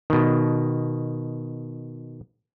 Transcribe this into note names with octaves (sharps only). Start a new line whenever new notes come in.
B2 D#3